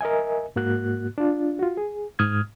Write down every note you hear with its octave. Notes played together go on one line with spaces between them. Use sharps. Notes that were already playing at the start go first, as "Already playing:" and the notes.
A#4 D#5 E5 G#5
G#2 A#3 F#4 F#6
D4 F4
F4 F#4
G#4
G#2 D#6 F6 G#6